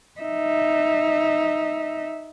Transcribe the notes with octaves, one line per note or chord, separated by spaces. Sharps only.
D#4 E5